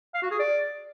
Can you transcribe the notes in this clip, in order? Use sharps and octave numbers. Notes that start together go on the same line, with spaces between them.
F5
F#4
G#4
D5